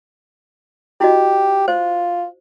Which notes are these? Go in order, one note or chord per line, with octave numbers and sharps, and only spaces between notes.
E4 F#4 G4 D#5
F4 C5